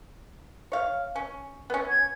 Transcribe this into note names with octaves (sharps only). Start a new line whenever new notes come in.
C#5 F5
C#4
B3 C#4
G#6